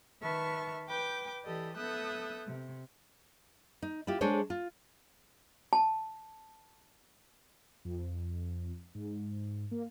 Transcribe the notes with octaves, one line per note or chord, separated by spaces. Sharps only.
D#3 B4 E5 A5 C#6 F6
B4 G5 D6 G6
E3 G4 A4 D5 D#5
B3 A4 E5 D#6 F#6 G6
C3
D#4
E4 F4 G4
G#3 D4 G#4 A4 C5 C#5
F4
A5
F2
G#2
A#3